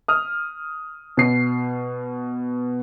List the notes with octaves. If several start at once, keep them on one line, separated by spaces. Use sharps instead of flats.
D#6 F6
B2 C7